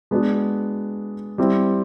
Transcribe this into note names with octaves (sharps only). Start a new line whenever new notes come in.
G#3 B3 D4 F#4 B4
G3 C4 E4